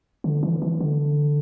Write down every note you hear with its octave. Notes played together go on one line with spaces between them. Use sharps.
D3
E3
E3
D3